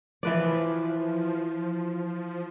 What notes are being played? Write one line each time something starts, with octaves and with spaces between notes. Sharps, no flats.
E3 F3 B4 D5